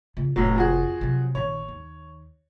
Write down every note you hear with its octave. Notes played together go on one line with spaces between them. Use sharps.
C#3 F4
F1 A2 F#3
F3 F#4 G#4
C3 F#3
A#1 D#3 C#5
D#2